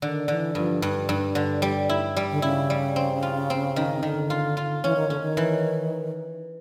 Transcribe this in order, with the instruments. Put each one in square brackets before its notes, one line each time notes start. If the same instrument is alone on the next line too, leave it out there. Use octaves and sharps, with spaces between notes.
[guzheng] D3 [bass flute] D#3
[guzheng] D3 [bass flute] E3
[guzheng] G2 [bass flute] F3
[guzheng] G2
G2
D3
G3
E4
G3
[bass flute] D3
[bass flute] C#3 [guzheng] E4
[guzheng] G3
C4
F4
C4
D#3
[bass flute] D3 [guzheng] D#3
[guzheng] F4
F4
[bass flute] E3 [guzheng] C#4
[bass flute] D#3
[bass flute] D3 [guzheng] C#4
[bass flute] D#3
[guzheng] E3